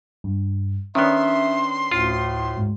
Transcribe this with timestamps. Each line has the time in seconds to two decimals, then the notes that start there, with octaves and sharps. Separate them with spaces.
0.24 G2
0.95 D#3 B3 C#4 D4 E5 C6
1.91 D2 A2 F4
2.57 G#2